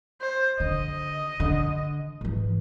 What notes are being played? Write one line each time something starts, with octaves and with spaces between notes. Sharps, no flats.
C5
D3 D#5
D3
G#2 E3